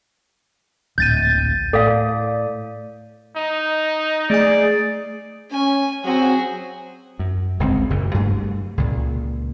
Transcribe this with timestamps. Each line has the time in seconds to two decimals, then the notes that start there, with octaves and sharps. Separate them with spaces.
0.98 D1 A#1 G6 A6 D#7
1.73 A2 A4 D5 F5
3.37 D#4
4.30 A3 G#4 D5 G#5
5.51 C#4 G#5
6.04 F#3 C4 F#4 G#4
7.19 F#2
7.59 G1 C#2 F#2 C4
7.90 F#1 A#2 C#3
8.14 G2 F#3 A3
8.77 C#2 A#2 C#3